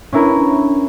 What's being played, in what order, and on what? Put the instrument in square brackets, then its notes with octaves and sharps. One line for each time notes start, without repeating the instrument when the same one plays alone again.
[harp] C#4 D4 E4 A#4 B4